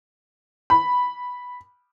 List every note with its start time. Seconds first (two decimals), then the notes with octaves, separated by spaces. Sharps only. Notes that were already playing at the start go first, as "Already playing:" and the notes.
0.70 B5